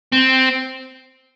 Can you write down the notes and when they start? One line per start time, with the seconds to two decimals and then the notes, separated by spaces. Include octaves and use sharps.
0.13 C4